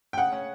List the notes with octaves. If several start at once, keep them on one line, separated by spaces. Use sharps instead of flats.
G5
C#3 F#5
C#4